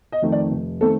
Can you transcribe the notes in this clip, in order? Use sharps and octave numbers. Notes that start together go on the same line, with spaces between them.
D#5
F2 D#3 A3 C4
D5
F1
D#3 A3 C4 A4